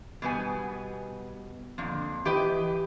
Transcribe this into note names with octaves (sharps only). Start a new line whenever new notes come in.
B2 G3 B3 G#5
F2 A#2 D3
E3 G4 B4 D#5 G5